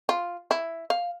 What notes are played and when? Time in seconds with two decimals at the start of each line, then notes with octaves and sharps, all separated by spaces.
0.09 F4
0.51 E4
0.90 F5